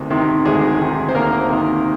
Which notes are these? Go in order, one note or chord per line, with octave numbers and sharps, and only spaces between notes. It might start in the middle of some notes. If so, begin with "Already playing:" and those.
Already playing: D2 C3 D#3
C3 D#3
D2 G#3 G#4
C3 D#3
C5
D2 A#3 A#4
C3 D#3